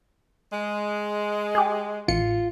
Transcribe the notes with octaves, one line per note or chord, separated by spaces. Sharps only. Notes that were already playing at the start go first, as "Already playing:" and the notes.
G#3
G4 G#4
A1 F4 C#7